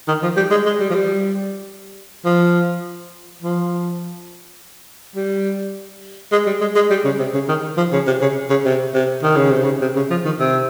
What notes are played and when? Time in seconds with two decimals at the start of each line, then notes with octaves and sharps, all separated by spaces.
0.08 D#3
0.23 F3
0.37 G3
0.51 G#3
0.66 G#3
0.80 G3
0.90 F3
0.95 G3
2.25 F3
3.42 F3
5.16 G3
6.32 G#3
6.46 G3
6.61 G#3
6.75 G#3
6.90 G3
7.05 C#3
7.19 C3
7.34 C#3
7.49 D#3
7.77 F3
7.93 C#3
8.07 C3
8.21 C#3
8.50 C#3
8.65 C3
8.94 C3
9.23 D#3
9.36 C#3
9.51 C3
9.64 C#3
9.81 C3
9.96 C#3
10.10 F3
10.25 D#3
10.40 C3